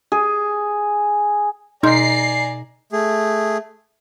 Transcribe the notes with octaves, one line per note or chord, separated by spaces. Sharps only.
G#4
B2 D#4 D5 G#5 A#5 C6 G6 C7
A3 G#4